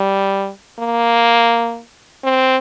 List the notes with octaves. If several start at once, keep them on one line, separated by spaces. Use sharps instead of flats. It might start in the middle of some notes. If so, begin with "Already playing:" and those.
Already playing: G3
A#3
C4